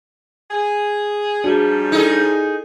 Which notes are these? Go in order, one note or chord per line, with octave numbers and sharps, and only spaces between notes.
G#4
G#2 F3 G3 D4 F#4 G#4
D#4 E4 G#4 A4